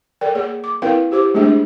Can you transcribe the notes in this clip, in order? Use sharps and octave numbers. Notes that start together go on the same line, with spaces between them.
A4 A#4 D5 G5
A#3 G#4 C#5
D6
C4 E4 A#4 B4 F5 G5
E4 G4 C5 D6
G#3 A3 C4 D4 G#4 C5